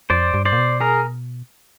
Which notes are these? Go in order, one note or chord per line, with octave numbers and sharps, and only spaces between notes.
F2 C5 D5
G2
C5 D5
A#2
B2
G#4 A#4